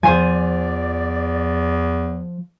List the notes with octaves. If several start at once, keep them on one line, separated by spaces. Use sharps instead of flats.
E2 F3 C5 D5 G#5